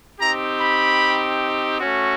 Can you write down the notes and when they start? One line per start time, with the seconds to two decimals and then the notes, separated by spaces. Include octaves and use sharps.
0.19 C4 D#4 G4 A#5
0.60 B5
1.80 A3 C#4 F#4